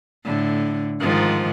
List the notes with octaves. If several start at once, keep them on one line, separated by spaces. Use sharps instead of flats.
A2 D3
G#2 D#3 F3